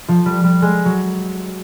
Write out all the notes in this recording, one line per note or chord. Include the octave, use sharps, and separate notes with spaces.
F3
G3
G3
G#3
F#3